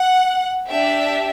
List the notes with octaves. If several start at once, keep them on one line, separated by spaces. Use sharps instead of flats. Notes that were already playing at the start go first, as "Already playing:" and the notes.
Already playing: F#5
D4 G4 E5